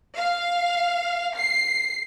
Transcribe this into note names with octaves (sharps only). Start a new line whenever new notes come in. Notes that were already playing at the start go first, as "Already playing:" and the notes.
F5
C7